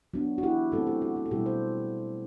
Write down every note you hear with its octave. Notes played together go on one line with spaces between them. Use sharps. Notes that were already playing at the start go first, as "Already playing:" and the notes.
F#3 B3 D4 F#4
F#4
E4 G4
F#3 A3 C4 F#4 A4
E4 G4
F#4
F#4
A4
B2 G3 B3 E4 G4
A4 C5